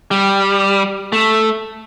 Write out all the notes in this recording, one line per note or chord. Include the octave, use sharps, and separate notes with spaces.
G3
A3